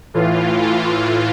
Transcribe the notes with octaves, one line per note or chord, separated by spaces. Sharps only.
A2 E3 F4
A2 E3 F4